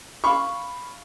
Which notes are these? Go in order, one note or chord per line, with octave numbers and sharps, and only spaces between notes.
F5 B5 C#6